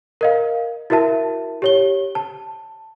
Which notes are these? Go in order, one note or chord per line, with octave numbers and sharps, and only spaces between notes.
A#4 D#5 F5
E4 F#4 A#4 E5 A5
G4 C#5 G7
A5